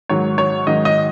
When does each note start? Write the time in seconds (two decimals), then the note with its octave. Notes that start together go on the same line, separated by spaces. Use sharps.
0.09 G#2 D#3 F#3 C#5
0.38 C#5
0.67 G#2 D#3 F#3 D#5
0.85 D#5